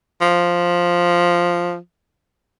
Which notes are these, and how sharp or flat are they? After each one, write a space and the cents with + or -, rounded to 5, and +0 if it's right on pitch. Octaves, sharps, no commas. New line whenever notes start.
F3 +0